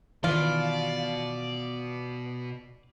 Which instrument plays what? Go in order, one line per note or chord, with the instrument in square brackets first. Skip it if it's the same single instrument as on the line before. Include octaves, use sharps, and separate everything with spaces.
[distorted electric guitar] B2 [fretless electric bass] D#3 E3 [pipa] F4 [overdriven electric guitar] D5